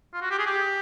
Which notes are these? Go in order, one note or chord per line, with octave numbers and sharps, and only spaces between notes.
F4
F#4
G4
G#4
G4